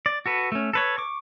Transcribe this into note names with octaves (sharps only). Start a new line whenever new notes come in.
D5
F#4 A4 B4
A3 C#4
A4 B4 C#5
C#6 D6